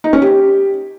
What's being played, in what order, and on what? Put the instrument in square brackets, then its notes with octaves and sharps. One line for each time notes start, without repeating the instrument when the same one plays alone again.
[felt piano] D#4
C#4
G4